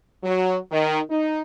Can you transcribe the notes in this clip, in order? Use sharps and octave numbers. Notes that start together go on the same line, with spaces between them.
F#3
D#3
D#4